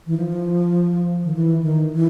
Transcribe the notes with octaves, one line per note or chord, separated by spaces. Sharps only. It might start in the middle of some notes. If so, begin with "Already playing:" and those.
E3
F3
D#3
E3
D#3
E3